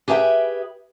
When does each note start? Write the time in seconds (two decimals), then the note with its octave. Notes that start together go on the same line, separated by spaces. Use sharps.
0.08 G4 G#4 B4 E5 F5 G5